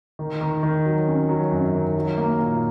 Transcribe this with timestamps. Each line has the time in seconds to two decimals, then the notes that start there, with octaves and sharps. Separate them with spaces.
0.19 D#3
0.41 D#3
0.63 D#3
0.86 F#3
1.07 C#4
1.29 F#3
1.52 F#2
1.73 D#3
1.96 F#3
2.18 A#3
2.39 A#2